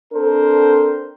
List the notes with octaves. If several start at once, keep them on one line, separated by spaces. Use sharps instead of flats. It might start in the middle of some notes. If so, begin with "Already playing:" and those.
C4 D4 A4 A#4 C5